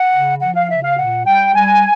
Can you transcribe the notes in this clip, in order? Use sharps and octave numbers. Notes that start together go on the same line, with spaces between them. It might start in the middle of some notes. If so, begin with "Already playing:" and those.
Already playing: F#5
C#3
F3 F#5
F5
C#3 E5
F5
A#2 F#5
G3 G5
G3 G#5